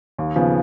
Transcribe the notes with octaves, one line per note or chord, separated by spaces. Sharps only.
D#2
C#3 F3 B3